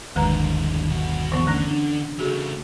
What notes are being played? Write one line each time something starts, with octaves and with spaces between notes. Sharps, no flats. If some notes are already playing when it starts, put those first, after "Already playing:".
G1 D#2 D3 F3 G#3 B4 A#5
B1 F#4
D3 E3 B3
D3 A3 C#4
D4
C#3 A3 F#4 G#4